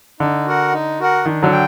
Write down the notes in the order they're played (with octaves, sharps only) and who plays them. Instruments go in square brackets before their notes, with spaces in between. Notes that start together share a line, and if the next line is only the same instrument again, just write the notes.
[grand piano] D3 [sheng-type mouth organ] D#4
[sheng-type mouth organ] F#4 A#4 F#5
D#4
F#4 A#4 F#5
[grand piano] D#3 [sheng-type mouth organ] D4
[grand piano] D3 F#3
[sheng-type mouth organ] G5